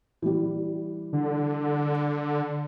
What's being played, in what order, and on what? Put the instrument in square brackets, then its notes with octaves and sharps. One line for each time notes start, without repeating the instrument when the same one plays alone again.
[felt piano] E3 G3
[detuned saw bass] D3